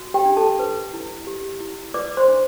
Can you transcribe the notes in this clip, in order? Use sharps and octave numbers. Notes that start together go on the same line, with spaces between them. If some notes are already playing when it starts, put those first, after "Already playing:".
Already playing: F#4
G4 G5
D4
A4 A5
B4
E4
G4
E4
B4 D5 D6
C5 C6
D4